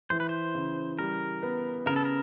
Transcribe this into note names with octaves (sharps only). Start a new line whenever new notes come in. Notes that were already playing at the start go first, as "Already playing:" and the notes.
E3 C5
B4
C5
C#3
G3 A#4
B3
C#3 A#4
A4
A#4